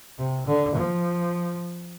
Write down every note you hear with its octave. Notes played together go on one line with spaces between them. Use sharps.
C3
D3
F3